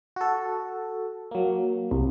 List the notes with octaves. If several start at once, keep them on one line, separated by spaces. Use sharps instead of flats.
F#4 A4
F#3 A#3
C2